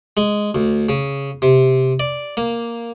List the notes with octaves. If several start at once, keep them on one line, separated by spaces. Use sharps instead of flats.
G#3
D2
C#3
C3
D5
A#3